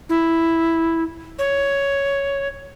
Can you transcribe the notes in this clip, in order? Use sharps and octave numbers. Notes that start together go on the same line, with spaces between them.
E4
C#5